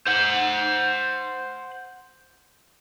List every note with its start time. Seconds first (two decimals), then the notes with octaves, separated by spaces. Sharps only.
0.07 C5 F#5